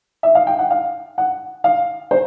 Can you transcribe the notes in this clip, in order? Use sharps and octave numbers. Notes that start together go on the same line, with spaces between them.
E5
F5
G5
F#5
F5
F#5
F5
C5